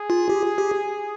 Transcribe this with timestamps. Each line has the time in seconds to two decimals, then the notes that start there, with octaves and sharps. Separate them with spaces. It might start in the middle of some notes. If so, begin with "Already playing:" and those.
Already playing: G#4
0.10 F4
0.29 G4
0.58 G4